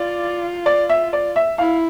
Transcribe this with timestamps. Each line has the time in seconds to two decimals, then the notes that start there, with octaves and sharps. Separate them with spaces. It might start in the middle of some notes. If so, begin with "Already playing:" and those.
Already playing: F4 D5
0.66 D5
0.89 E5
1.13 D5
1.36 E5
1.58 E4 F5